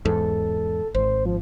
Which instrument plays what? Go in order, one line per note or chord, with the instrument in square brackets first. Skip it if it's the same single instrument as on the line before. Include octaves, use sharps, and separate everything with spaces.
[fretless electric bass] E2 G#2 [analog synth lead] A4
[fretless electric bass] G#1 [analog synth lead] C5
[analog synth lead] F3